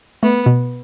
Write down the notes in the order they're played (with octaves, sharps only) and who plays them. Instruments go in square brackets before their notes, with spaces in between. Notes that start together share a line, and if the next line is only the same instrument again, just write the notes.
[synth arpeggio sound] A3 [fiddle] B3
[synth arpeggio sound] B2